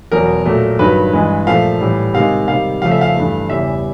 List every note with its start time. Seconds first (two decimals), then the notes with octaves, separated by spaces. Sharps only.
0.11 E2 B2 F#3 A#4
0.46 A#2 F#3 A3
0.79 G2 D#3 F#3 B4
1.13 G2 E3 G#3
1.47 A#2 F3 A3 F5
1.80 A2 E3 G3
2.14 C3 D#3 G#3 F5
2.48 C3 D#3 G3 F5
2.82 F2 C#3 F3 A3 F5
2.91 E5
3.01 F5
3.16 G2 E3 A3
3.49 E2 C#3 E3 G3 E5